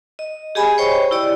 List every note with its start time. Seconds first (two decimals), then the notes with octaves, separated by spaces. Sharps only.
0.19 D#5
0.55 G4 G#4 D#5 G#5 B5
0.78 C5 C#5 D#5 G5 B5 C#6
1.11 E4 G4 D5